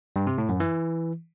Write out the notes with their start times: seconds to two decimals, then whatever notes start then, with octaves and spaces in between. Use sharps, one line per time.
0.16 G2
0.27 C3
0.38 A2
0.49 F#2
0.60 E3